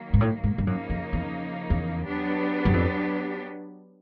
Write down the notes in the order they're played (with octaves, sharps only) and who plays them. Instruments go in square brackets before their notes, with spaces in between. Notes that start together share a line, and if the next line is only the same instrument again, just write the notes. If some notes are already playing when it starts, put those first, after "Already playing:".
Already playing: [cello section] D#3 F#3 A#3
[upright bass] G#2
A2
G#2
G2
[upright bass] F#2 [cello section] C#3 F3 A#3 D#4
[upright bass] F2
E2
E2
[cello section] F#3 B3 D4 G4
[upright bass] F#2
F2